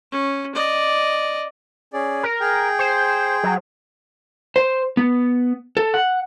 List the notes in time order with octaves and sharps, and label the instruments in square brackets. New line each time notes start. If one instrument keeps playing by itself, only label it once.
[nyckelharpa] C#4
D5 D#5
[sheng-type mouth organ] C#4 G#4 D5
[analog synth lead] A#4
[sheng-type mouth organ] G#4 G5
[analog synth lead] C5
F#3
[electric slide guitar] C5
B3
A4
F#5